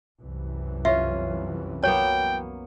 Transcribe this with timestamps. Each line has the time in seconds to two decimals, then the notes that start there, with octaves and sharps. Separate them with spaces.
0.21 C2 F#2 E3
0.85 C#4 F4 E5
1.84 F#3 A#3 B3 C#5 G5